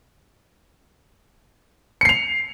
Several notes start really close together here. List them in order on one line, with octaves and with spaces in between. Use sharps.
C#7 C7 F7